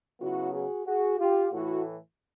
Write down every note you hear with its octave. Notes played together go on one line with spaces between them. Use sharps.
C#3 F#3 B3 E4 F#4
F#4 G#4
F#4 G#4
F4 G4
A2 E3 A3 E4 F#4